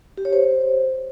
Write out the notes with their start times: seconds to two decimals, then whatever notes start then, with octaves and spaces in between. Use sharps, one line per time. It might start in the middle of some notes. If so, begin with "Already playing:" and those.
0.18 G4
0.25 C#5
0.33 C5